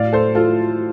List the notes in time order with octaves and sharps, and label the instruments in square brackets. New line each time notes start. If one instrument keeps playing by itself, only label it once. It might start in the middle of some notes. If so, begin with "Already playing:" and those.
Already playing: [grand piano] A2 D5 F5
A4 C5
F4 A4